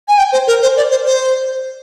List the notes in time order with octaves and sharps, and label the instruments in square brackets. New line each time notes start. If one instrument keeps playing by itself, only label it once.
[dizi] G#5
G5
C5
A#4
C5
D5
C5
C5